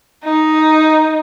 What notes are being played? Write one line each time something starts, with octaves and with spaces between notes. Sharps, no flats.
D#4